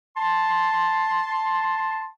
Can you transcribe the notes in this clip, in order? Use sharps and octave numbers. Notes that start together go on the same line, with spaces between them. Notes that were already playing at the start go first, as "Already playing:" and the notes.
A5 C6